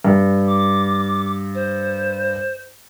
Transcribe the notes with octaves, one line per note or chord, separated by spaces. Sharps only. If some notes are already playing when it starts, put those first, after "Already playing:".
G2
D6
C5